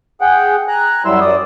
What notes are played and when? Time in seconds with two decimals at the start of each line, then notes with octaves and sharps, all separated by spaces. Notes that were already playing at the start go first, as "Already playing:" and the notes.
0.21 G#4 F#5 G5
0.68 G#5 A#5 F#6
1.05 F#2 F#3 G3 E4 C6 E6
1.21 F#2 D5 D#6